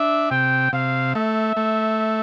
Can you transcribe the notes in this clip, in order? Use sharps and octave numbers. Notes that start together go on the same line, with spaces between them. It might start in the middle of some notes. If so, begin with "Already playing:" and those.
Already playing: D4 E5
C3 G5
C3 F5
A3 E5
A3